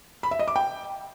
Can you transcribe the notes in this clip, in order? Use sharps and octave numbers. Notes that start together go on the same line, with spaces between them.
B5
E5
D#5
D6
G5